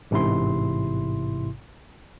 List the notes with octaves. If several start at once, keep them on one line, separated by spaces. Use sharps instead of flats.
A1 G#2 C3 E4 C6